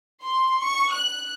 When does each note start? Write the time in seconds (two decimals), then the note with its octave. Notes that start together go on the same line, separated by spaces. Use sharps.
0.23 C6
0.64 C#6
0.93 F#6